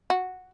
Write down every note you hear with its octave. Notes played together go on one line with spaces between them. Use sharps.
F#4